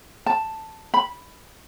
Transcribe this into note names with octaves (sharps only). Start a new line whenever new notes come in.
A5
B5